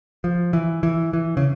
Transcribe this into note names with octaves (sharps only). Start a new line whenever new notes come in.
F3
E3
E3
E3
C#3